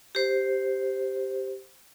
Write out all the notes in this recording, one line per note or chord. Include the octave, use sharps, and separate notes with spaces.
G4 C5